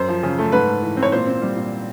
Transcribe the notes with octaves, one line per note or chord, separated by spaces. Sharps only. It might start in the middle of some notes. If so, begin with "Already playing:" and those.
Already playing: F#2 C5
F3
C#3
A3
G#2 B4
A3
E3
C4
C#5
A#2 C5
C4
G3
A#2